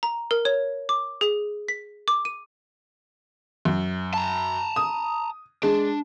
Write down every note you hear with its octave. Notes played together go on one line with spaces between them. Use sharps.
A#5
A#4
C#5
D6
G#4
B6
D6
D#7
F#2
A5 A#5
D#6
G#3 D4